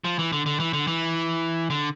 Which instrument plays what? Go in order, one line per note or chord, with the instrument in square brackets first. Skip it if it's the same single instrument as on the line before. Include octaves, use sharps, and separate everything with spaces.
[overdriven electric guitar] F3
E3
D3
D3
E3
D3
E3
D3